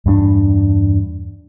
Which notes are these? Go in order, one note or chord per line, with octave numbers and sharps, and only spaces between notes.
E2 G2 A3 D4